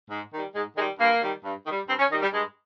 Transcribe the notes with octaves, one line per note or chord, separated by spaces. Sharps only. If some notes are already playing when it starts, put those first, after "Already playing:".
G#2
D#3 G3
G#2 G#3
D#3 G3 G#3
G2 A#3
D#3 G3
G2
D#3
G3
G2 C4
C#4
D#3 G3 D#4
G3
G2 G#3